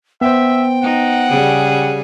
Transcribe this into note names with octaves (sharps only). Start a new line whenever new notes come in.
B3 C5 E5 G5
D#4 F#5
C#3 G3 G#4